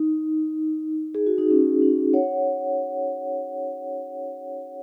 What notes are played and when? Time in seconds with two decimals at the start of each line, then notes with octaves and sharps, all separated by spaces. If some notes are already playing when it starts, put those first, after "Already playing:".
Already playing: D#4
1.15 G#4
1.27 F#4
1.38 D#4
1.51 C#4
1.82 D#4
2.13 C#5 F#5